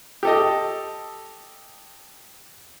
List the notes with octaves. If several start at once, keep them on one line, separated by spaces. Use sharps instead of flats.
G4 A4 D#5